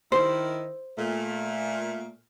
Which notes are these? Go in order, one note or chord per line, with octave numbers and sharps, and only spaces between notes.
D#3 E4 C5
A#2 A3